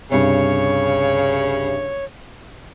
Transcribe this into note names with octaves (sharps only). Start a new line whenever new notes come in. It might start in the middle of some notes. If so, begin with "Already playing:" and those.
C2 G2 C#3 C#5